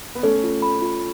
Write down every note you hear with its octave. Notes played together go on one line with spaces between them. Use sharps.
B3
A3 C#4 A4
F4
B5
F4